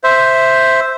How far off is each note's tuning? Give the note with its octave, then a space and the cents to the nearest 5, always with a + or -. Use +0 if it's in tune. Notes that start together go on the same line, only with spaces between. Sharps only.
C5 +0 E5 +0